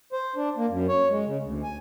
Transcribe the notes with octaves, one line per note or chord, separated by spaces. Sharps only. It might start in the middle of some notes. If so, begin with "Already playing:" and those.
C5
D4
A#3
F#2
C#5
G#3
C#3
D2
G#5